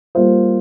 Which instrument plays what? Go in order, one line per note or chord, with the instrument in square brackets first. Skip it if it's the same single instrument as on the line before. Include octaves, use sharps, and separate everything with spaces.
[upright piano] G3 A#3 F4 C5